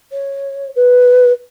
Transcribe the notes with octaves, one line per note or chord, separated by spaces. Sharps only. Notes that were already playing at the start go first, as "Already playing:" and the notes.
C#5
B4